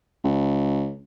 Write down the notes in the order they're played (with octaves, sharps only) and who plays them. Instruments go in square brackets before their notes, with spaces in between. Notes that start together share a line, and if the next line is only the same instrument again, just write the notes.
[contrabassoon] C#2